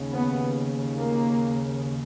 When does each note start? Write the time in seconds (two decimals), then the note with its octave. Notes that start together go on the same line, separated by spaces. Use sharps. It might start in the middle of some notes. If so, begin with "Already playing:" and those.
Already playing: D#2 C#3
0.11 B3
0.97 A#3